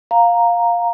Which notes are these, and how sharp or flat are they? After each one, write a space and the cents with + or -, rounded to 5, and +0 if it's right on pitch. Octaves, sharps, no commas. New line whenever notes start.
F5 +10 A#5 +0